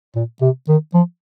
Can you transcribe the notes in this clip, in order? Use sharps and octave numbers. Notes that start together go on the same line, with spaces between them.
A#2
C3
D#3
F3